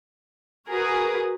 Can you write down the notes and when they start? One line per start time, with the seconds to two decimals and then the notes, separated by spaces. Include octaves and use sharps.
0.69 F#4 G#4 A#4 B4 D#6